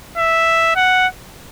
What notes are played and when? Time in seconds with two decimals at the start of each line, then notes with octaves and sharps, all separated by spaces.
0.18 E5
0.76 F#5